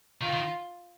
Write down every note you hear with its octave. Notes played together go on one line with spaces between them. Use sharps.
D#3 F4
D#3